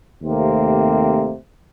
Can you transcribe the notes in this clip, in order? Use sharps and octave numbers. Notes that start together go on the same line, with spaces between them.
D#2 C3 A3 A#3 C4